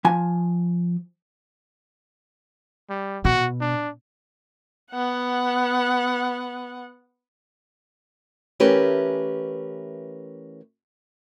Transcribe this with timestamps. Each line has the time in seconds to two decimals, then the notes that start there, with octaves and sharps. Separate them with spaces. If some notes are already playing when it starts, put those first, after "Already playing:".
0.05 F3 G#5
2.90 G3
3.25 B2 F#4
3.61 D4
4.91 B3 F#5
8.60 E3 A3 C#4 G4 A#4 B4